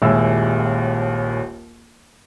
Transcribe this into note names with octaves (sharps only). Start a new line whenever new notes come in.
D#1 A#1 D#2 G#3 E4 E6